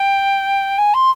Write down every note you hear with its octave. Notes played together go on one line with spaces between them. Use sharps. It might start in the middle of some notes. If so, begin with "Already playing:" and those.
Already playing: G5
G#5
C6